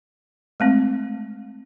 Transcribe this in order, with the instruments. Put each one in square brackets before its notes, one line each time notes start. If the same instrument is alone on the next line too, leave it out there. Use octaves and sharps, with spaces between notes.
[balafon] G#3 A3 C4